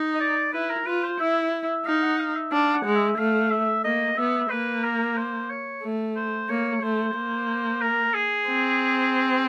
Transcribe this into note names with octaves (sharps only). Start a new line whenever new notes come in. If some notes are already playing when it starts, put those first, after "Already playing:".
Already playing: D#4
D#5
D5
E4 B4
A#4
F4 B4
C5
E4 E5
E5
D#4 F5
F#5
F5
E5
D4 F5
F#5
G#3
E5
A3 F5
E5
A#3 D#5
B3 E5
A#3 B4
A#4
C5
C#5
A3
C5
A#3 C#5
A3 C5
A#3
A#4
G#4
C4